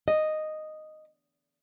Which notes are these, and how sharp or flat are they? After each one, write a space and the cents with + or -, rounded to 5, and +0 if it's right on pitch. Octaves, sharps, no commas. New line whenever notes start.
D#5 -5